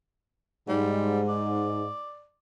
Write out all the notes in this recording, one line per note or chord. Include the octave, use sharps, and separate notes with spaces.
G#2 G3
D5